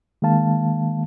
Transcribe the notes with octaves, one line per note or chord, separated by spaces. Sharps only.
D#3 G#3 A#3 F5 A5